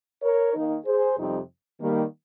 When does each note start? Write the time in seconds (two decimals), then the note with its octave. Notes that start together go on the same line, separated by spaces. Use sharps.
0.23 A#4 C#5
0.54 D#3 A#3 D#4
0.85 G#4 C5
1.17 F2 C3 G3 C4 D#4
1.81 D#3 G3 A#3